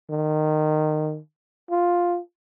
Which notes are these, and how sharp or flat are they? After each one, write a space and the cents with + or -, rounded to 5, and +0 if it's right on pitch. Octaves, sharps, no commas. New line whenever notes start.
D#3 -20
F4 +5